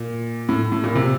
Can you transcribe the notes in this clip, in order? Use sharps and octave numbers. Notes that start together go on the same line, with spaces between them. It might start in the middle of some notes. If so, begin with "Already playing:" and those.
Already playing: A#2
A2
A2
A#2
C3